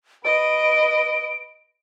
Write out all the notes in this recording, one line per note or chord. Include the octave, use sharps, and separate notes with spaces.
B4 D#5 D7